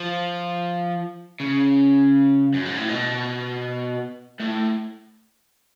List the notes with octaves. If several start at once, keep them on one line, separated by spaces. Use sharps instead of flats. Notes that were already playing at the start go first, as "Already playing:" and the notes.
Already playing: F3
C#3
F#2
G#2
A2
B2
A2